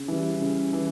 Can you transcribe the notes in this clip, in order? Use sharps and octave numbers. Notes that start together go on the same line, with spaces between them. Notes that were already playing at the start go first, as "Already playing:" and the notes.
Already playing: C#3
E3 G3
C#3
E3